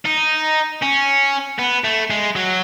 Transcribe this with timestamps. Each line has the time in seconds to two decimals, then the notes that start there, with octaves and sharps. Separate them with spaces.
0.05 D#4
0.82 C#4
1.59 B3
1.84 A3
2.10 G#3
2.36 F#3